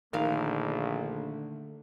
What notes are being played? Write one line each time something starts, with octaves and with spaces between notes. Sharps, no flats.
A#1 D3 D#3 A3 A#4 F5